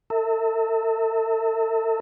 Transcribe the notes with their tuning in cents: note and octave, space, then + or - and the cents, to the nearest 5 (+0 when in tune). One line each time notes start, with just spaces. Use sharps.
A4 +40 E5 -25